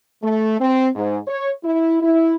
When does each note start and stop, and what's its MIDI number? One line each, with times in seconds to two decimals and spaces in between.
0.23 0.58 57
0.60 0.89 60
0.96 1.17 44
1.27 1.50 73
1.63 1.98 64
2.02 2.35 64